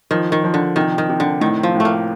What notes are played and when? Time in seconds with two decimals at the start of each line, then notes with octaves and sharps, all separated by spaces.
0.11 D#3 F3
0.32 D#3
0.44 F3
0.54 D3
0.76 C3 D#3
0.98 D#3
1.09 C3
1.20 D3
1.41 A2 D#3
1.63 F3
1.75 A2
1.80 A3
1.85 A#3